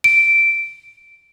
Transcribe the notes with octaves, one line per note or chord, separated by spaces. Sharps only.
D7